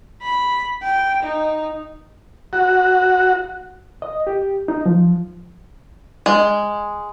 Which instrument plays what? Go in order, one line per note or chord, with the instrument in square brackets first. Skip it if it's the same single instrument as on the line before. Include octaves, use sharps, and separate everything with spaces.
[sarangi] B5
G5
D#4
[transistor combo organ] F#4
[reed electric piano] D#5
G4
D#4
F3
[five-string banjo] G#3